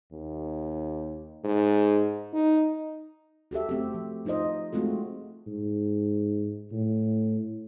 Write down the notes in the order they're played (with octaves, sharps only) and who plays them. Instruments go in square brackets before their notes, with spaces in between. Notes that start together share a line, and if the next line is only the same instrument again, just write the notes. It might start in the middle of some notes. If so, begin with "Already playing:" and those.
[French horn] D#2
G#2
D#4
[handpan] F#4 G4 A4 E5
A3 C4 G4
F3
F3 D#4 F4 C5 D#5
G#3 A3 C4 F4 F#4 A4
[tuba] G#2
A2